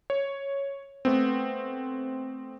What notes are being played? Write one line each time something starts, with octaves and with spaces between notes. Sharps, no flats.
C#5
A3 B3 C4